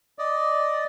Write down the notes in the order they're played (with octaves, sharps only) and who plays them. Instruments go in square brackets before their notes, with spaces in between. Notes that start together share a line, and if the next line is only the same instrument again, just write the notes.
[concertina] D5 D#5